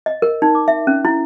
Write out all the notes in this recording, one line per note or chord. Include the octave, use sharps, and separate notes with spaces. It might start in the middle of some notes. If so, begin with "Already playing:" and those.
D#5
A#4
D#4
D6
E5
C#4
E4